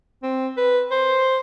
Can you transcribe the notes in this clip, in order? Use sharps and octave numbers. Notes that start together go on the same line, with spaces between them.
C4
B4
C5